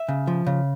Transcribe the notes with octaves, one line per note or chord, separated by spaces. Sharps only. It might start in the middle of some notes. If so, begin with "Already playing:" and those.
Already playing: E5
C#3
F3
C#3